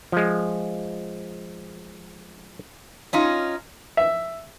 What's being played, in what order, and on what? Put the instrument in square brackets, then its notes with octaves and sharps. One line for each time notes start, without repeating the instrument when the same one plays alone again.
[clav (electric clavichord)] F3 G#3
[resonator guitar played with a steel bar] C#4 D#4 F4
[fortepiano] E5